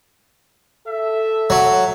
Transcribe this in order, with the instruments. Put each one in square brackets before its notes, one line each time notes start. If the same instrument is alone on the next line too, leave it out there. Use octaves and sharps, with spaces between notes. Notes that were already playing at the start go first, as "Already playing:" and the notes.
[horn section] A4 E5
[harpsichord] F#3